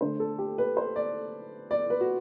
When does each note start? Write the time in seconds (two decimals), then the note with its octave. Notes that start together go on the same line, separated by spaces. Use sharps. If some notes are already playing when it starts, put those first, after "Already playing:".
0.01 D3 A3 D4 C5
0.20 A4
0.38 G4
0.58 B4
0.77 C5
0.96 D5
1.71 D5
1.90 B4
2.01 F#4